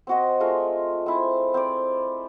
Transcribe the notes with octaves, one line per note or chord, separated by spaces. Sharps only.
C4 F#4 D#5
G#3 A3 F4
C4 E4
C4 D5